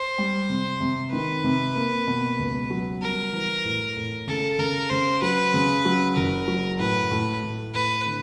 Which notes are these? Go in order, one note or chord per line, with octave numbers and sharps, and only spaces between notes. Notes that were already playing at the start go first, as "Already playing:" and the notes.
Already playing: C5
G3
C3
C3
D#3 B4
C3
A#3
B2
C#2
F#3
G3 A#4
E3
A2
A2
C#3 A4
C#3 A#4
C#3 C5
F#3 B4
C#3
F#3
F#1 A#4
F#3
A2 B4
A2
A2
A2 B4
D3